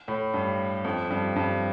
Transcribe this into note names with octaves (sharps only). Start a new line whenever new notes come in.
A2
G2
F2
G2
G2